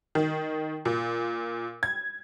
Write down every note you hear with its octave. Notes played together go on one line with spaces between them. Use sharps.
D#3
A#2
G#6